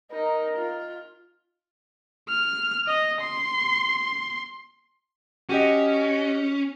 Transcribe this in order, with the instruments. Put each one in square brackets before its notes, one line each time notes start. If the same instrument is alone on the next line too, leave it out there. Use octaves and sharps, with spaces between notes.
[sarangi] D#4 [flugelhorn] A#4
[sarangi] F4
[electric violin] F6
D#5
C6
[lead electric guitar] C#4 [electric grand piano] F#4 G4 D#5